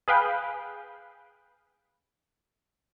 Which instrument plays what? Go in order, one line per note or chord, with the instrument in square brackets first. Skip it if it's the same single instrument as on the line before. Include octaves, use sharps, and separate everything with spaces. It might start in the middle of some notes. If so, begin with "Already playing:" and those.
[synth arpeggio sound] G#4 B4 F5 G5